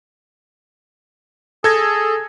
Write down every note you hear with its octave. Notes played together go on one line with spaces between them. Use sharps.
G#4 A4 G#6 A#6